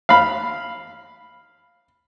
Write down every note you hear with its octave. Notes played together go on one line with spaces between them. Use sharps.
F5 B5